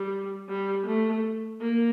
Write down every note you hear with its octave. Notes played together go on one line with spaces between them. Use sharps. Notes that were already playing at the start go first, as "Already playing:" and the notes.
Already playing: G3
G3
A3
A#3